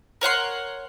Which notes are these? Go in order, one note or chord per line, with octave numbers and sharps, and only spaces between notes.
A#4 C#5 F#5 C6